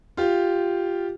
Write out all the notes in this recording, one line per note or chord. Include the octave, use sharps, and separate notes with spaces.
F4 G4